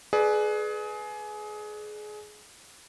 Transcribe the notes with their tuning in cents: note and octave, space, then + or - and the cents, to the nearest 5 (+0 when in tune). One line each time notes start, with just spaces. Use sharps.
G#4 +25 B4 +0 D5 +20